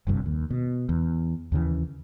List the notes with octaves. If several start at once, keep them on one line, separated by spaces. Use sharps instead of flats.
F#1 C2 G2 C3
D#2
B2
E2
D#2 C#3 E3